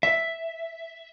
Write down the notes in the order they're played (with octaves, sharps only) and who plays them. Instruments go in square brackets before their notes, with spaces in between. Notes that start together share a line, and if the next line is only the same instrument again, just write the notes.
[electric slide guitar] E5